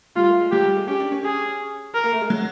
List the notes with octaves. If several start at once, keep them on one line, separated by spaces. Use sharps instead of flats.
G3 F4
A3
G#3
F#3 G4
G3
G#3
C#4 G4
D4
C#4
G#4
A#4
A#3
A3
G#3
F#3